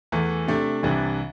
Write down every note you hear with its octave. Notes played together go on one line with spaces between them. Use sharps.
E2 E3 A3
C3 A3 D4
C2 C3 E3 G3 D4